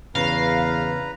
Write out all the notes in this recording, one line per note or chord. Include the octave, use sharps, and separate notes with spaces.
E2 C#3 B4 F5 A#5